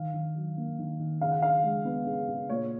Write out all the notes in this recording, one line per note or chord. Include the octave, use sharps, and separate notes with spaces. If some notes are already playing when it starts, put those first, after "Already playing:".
Already playing: D#3 F5
D#3
F#3
A#3
D#3
D#3
C#3 F5
F#5
C#3 F5
G#3
B3
C#3
C#3
A#2 C#5